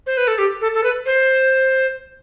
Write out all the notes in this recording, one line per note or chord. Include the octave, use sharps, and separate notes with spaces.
C5
B4
A4
G4
A4
A4
B4
C5